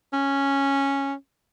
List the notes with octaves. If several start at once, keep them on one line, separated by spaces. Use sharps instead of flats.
C#4